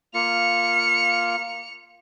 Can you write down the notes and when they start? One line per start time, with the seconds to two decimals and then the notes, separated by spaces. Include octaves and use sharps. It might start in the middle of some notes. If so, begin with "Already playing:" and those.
0.14 A#3 F4 C#7 F7